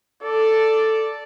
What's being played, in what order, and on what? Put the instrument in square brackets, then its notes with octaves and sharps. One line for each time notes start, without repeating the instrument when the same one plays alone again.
[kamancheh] A4 [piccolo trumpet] D5